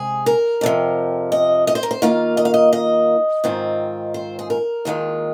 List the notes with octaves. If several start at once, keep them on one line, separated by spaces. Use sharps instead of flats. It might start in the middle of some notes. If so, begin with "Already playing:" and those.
Already playing: C3 G#3 G#4
A#4
F2 C3 F3
D#5
D#5
C5
A#4
C5
D#3 A#3 F4 F5
D#5
F5
D#5
D#5
G#2 D#3 C4 F4
C5
G#4
A#4
D#2 D#3 G#3 F4